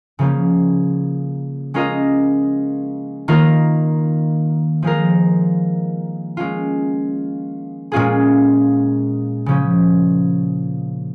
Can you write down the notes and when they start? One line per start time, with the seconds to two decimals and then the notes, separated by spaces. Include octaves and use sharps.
0.19 C#3 F3 A#3 C#4
1.74 G#3 C#4 F4 A#4 D#5
3.28 D#3 A#3 F4 A#4
4.83 F3 G#3 F4 A#4
6.37 G#3 C#4 F4
7.92 A#2 G#3 C#4 F4 G#4
9.46 C#3 F3 C#4